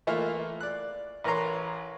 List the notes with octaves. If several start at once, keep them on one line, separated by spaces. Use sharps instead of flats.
E3 A3 A#3 F4
D5 F#6
A1 A#4 B4 C#5 A#5 C6